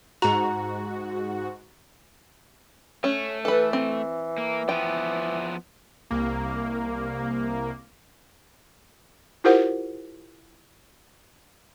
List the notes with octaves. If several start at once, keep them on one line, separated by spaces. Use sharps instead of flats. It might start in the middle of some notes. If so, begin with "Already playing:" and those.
G#2 F#4 A#5
A3 C#4
E3 A4 B4
C4
A#3
F3 B3 G5
C2 A#3
E4 F4 G4 A#4 C5 F#5